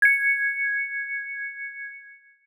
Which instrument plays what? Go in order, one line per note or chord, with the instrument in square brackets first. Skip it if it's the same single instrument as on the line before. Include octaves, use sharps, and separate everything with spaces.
[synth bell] G#6 C#7